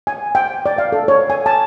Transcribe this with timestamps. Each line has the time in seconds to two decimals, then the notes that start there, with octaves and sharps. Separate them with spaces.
0.07 G#5
0.35 G5
0.66 D5
0.78 F5
0.92 A4
1.08 C#5
1.30 G#5
1.46 A5